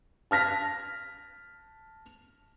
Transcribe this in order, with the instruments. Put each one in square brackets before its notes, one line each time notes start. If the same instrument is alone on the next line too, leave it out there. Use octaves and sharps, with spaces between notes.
[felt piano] A5 F6 A#6 B6